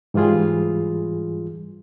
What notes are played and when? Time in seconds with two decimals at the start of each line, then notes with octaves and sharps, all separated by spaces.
0.14 G#2 E3 G3 F4 G#4